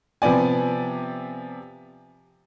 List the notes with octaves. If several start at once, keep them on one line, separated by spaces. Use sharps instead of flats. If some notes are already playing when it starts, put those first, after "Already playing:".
C3 F3 B3 D5 G#5